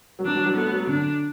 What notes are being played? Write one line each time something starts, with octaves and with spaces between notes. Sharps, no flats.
F#3
E3 D4
F#3
F#3
A3 B3
F#3
D3 D4